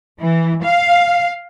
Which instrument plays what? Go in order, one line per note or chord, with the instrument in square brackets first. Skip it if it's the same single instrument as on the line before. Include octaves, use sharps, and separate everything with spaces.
[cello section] E3
F5